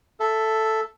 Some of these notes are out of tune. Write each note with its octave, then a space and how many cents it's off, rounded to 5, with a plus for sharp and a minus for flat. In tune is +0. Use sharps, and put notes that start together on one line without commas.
A4 +0 E5 +10